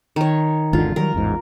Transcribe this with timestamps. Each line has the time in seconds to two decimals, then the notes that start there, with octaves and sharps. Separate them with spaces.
0.16 D#3 C#5
0.73 G#1 E2 D3 F4
0.96 D#3 F#3 G3 A#4
1.14 A1 E2 G#2